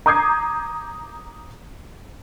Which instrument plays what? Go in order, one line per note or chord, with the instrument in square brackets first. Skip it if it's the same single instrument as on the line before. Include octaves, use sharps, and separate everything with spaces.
[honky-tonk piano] A#5 D6 D#6 G6 G#6 C7